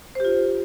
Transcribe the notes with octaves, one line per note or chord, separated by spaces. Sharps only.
F4 G4 C5